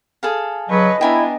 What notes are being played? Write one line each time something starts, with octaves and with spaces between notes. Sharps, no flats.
G#4 A4 F5
C#3 F#3 B4 C#5 D#5
B3 D4 E4 G5 G#5 A#5